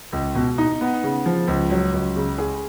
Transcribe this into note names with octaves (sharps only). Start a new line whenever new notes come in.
C#2
B2
D#4
B3
C#3
F3
C#2
F#3
C#2
C#3
G#4